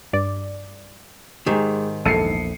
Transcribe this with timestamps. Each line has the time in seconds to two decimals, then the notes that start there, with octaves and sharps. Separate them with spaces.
0.13 G2 D5
1.46 G#2 D#3 G#3 G4
2.05 A#1 E2 A4 C7 C#7 D#7